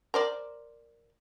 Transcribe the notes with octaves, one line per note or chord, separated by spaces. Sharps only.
A#4 C5 D5